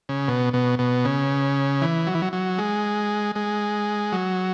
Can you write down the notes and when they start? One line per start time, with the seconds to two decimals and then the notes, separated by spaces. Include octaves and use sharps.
0.09 C#3
0.28 B2
0.53 B2
0.79 B2
1.05 C#3
1.82 E3
2.07 F#3
2.14 E3
2.22 F#3
2.33 F#3
2.58 G#3
3.35 G#3
4.12 F#3